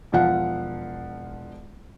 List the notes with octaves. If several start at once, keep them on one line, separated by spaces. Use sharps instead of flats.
E1 F3 F5 F#5